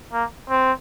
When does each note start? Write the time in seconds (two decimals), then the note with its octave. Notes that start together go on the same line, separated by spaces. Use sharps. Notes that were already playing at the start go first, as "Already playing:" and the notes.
0.13 A#3
0.50 C4